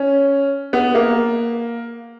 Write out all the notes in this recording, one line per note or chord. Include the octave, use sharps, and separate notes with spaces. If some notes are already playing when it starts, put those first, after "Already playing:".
Already playing: C#4
B3
A#3